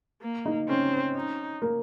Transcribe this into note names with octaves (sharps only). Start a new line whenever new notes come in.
A#3
D#4
C4 C#4
D#4
A#3